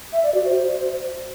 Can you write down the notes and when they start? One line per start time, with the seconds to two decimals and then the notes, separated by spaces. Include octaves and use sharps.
0.13 E5
0.24 D5
0.34 F#4
0.45 C5